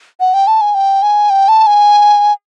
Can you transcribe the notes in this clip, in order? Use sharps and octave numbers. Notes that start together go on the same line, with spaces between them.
F#5
G5
A5
G#5
G5
G#5
G5
A5
G#5